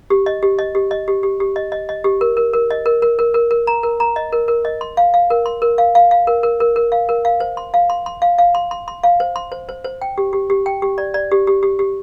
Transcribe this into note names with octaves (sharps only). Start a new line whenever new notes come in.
G4
D#5
G4
D#5
G4
D#5
G4
G4
G4
D#5
D#5
D#5
G4
A#4
A#4
A#4
D#5
A#4
A#4
A#4
A#4
A#4
A#5
A#4
A#5
D#5
A#4
A#4
D#5
C6
F5
F5
A#4
C6
A#4
F5
F5
F5
A#4
A#4
A#4
A#4
F5
A#4
F5
C5
C6
F5
C6
C6
F5
F5
C6
C6
C6
F5
C5
C6
C5
C5
C5
G5
G4
G4
G4
G5
G4
D5
D5
G4
G4
G4
G4